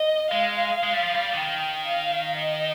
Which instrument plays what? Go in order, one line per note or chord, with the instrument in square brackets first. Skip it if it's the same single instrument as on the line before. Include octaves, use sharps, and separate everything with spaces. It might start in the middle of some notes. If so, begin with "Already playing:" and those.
Already playing: [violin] D#5
[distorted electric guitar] G#3 [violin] F5
[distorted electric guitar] G#3
G3
F3
G3
[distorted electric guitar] D#3 [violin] G5
[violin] F5
D#5